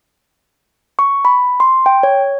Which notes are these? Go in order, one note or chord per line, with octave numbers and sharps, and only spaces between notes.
C#6
B5
C6
G5
C#5